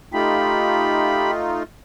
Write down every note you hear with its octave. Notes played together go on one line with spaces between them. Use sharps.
A3 D#4 F4 G4 B5